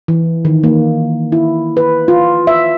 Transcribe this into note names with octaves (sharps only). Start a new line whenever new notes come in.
E3
D#3
A#3
E4
B4
F4
E5